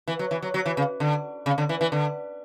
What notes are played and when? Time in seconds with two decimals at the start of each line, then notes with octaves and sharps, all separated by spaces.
0.08 E3
0.19 F#3
0.31 E3
0.42 F#3
0.54 F#3
0.66 E3
0.77 C#3
1.00 D3
1.46 C#3
1.58 D3
1.69 E3
1.81 E3
1.92 D3